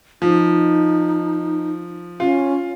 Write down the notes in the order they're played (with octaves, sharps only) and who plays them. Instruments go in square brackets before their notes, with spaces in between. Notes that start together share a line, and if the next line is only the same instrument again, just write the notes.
[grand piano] F3 [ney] D#4
[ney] C#4 [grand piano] F4